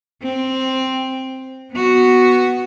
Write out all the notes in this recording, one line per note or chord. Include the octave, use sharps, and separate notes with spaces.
C4
B3 F#4